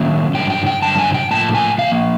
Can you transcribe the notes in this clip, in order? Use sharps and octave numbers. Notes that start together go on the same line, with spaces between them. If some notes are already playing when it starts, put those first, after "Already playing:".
Already playing: D#3 F#3 A#3 C#4
G2 D3 F#3 G5
G5
G5
G2 D3 F#3 A5
G#5
G5
A2 F3 A#3 A5
G#5
A2 F3 A#3 F5